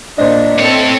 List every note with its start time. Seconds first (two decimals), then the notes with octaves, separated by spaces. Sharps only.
0.18 A#2 D4 C5 D#5
0.59 A2 C4 A4 C#5